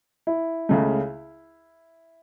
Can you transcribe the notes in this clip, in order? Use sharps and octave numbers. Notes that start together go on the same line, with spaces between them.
E4
C#2 C#3 A3